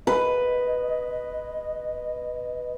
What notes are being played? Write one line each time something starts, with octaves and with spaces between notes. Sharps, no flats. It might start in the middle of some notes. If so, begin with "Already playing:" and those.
B4 D#5